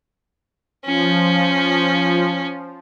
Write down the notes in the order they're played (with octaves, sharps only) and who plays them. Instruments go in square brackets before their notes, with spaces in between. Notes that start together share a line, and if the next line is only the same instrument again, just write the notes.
[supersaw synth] F3 [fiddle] C#4